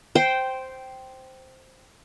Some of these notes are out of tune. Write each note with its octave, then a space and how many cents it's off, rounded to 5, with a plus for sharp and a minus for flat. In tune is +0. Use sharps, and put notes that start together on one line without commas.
C5 +0 G5 -10